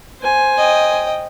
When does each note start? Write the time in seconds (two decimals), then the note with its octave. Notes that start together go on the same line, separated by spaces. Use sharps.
0.20 C5 G#5
0.57 D#5 G5